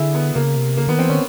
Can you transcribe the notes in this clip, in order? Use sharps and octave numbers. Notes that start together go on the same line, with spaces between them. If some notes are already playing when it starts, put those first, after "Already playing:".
Already playing: D3 E4 G#4
B3
C#3 A#3
C3
C#3 A#3
D#3 B3
E3 C4
D#3 C#4